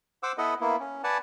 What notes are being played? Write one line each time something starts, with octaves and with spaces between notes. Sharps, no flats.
C5 F#5 D6 E6
B3 E4 A4 B4 D#5 F#5
A#3 B3 E4
C#4
B4 D5 F#5 G#5 A5